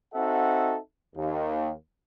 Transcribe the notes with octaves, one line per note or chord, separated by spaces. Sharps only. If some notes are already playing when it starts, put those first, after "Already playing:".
C4 D#4 F#4 A4 E5 F#5
D#2